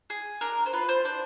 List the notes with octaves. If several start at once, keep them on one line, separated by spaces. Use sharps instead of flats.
G#4
D4 A#4
C5
F4 B4
C5
D4 C5